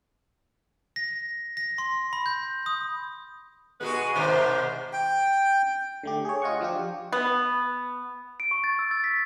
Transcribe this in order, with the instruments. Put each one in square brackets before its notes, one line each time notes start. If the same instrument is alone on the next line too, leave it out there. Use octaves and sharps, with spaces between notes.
[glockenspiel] A#6
A#6
C6
B5
G6
D#6
[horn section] B2 B3 B4 [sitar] G#3 F#4 G#4
[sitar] G#2 B2 D#3 [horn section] C5
[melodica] G5
[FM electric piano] D3 A3 G4
G#4 C#5
F4 D#5 F#5 C#6
F3 D4 F4 G4
[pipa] B3
[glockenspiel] D7
C#6
A6
E6
A6
B6